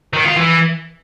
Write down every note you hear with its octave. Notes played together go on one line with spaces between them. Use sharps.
D#3
F4
E3